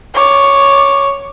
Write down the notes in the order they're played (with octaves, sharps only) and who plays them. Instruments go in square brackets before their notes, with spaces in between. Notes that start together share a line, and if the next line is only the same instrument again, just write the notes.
[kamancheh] C#5 D6